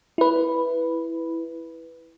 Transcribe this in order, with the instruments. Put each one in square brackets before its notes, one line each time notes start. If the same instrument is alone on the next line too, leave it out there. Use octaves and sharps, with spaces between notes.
[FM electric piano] E4 B4